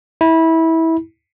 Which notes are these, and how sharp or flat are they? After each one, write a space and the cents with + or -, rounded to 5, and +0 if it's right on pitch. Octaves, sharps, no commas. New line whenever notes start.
E4 -20